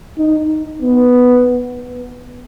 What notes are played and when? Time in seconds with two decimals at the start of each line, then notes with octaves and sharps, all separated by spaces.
0.18 D#4
0.82 B3